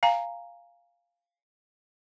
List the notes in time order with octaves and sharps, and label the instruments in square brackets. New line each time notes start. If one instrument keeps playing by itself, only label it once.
[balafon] F5 G#5 A#5